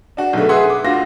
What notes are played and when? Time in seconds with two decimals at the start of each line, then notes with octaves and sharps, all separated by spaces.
0.17 D4 F#4
0.33 B1 B2 D3 A3
0.49 G#4 B4 E5 F#5 C6
0.70 D6
0.84 D2 D3 F4 F#4 F5 A#6